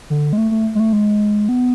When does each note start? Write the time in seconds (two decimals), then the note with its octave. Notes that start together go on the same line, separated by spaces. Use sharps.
0.10 D3
0.33 G#3
0.38 A3
0.51 A3
0.75 G#3
0.80 A3
0.93 G#3
1.49 B3